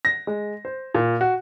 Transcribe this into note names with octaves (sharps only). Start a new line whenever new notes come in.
A#6
G#3
C5
A#2
F#4